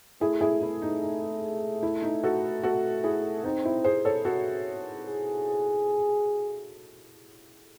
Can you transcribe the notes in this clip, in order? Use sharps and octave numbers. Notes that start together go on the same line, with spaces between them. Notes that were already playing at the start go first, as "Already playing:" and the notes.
A3 E4 G#4
E4 G#4
E4
D#4
D#4
E4
D#4
F#4 A4
F#4 A4
E4 G#4
C4 D#4
E4
G#4 C5
A4 C#5
F#4 A4
G#4